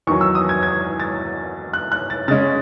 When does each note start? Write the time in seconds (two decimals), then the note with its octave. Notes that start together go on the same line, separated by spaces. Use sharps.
0.07 E2 D#3 F#3 C#6
0.21 E6
0.35 D#6
0.49 G#6
0.63 G#6
1.00 A6
1.73 F#6
1.92 F#6
2.10 A6
2.28 C#3 G#3 C#4 A6